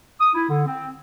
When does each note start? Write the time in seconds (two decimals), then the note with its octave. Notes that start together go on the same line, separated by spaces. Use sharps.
0.21 D#6
0.34 E4
0.50 D3
0.66 C4